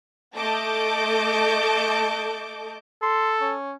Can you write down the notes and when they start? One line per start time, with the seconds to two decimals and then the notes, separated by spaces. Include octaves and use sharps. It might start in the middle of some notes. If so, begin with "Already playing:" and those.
0.36 A3 A4 D#5 A5 D6 G6
3.02 A4 C6
3.40 C#4